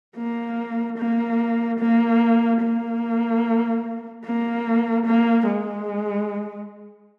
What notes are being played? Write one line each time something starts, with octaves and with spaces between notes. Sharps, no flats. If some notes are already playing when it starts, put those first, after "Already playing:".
A#3
A#3
A#3
A#3
A#3
A#3
G#3